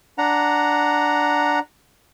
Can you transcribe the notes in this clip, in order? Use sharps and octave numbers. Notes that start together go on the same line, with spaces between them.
D4 F#5 A#5